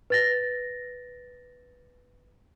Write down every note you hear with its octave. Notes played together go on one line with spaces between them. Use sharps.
B4 A6 A#6